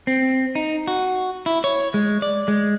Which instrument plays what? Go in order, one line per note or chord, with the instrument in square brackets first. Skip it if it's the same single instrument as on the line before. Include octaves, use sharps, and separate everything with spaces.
[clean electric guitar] C4
D#4
F#4
E4
C#5
G#3
D5
G#3